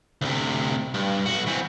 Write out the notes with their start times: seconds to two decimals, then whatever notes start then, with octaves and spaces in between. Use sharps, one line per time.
0.21 D2 C3
0.94 G2
1.26 B1 F#4
1.47 E3 C4